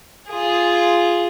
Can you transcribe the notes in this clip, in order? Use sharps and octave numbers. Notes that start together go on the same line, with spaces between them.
F4 G#4